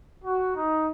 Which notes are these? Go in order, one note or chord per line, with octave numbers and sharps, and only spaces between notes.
F#4
D#4